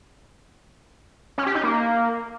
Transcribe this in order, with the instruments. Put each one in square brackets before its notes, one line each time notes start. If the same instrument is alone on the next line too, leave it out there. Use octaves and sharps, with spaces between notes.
[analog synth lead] C#4
G4
D#4
A#3